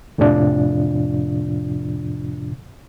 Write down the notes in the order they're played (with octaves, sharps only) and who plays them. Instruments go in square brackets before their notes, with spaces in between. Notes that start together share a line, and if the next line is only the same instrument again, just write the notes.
[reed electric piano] F2 A2 C3 F3 D4 F4